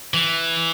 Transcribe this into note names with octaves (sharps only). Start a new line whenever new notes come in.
E3